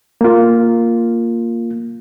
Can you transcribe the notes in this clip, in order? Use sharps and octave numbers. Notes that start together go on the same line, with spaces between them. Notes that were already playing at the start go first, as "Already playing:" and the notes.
A#3 F4